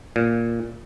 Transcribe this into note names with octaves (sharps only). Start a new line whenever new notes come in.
A#2